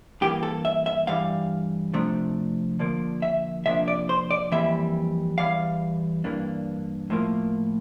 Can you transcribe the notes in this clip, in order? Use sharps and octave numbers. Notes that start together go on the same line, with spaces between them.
G2 E3 A#3 G4
A4
E5
E5
G2 E3 G3 F5
C3 F3 A3 D4
D3 F3 A#3
E5
C3 F3 A#3 D4 E5
D5
C5
D5
F2 E3 G3 A#3 E5
E2 E3 G3 F5
G2 E3 A#3 D4
A2 F3 A#3